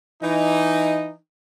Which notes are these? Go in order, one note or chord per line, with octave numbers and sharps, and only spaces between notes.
E3 D#4